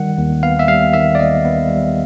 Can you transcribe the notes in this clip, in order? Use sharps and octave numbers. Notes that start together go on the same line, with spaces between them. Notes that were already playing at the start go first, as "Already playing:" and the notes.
Already playing: D#3 G3 F#5
D#2
B3 F5
E5
G3 F5
D#3 E5
D5
D#2 D#5
B3
G3